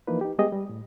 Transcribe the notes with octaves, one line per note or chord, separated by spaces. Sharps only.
E3 F3 A#3 D#4 E4 B4
D#4 G4
G3 G#3 B3 G4 G#4 D#5
G3
A2